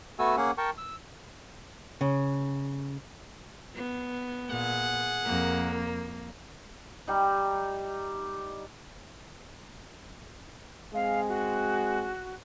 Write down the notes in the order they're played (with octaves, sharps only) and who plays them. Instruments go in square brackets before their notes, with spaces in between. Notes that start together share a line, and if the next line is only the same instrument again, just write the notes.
[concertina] A3 B3 F#4 A4 G#5 E6
A#3 C#4 G#4 F#5
A#4 G5 A5 C#6
E6
[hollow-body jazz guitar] C#3
[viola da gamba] B3
[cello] A#2 [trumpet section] G#4 F#5
[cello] F2 A#4 [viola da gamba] A#3
[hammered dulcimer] G3 D#4
[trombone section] G#3 C4 G#4 [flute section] F5
[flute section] F#4